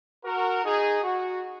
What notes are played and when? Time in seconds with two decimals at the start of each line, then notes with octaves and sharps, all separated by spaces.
0.24 F#4 A#4
0.64 D#4 G#4
1.04 F#4